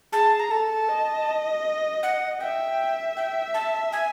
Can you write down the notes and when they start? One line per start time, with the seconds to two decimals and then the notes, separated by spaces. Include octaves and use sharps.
0.13 G#4 A5
0.40 A#5
0.51 A4 A5
0.89 D#5
2.03 F#5
2.40 E5 G5
3.17 G5
3.54 A5
3.92 G#5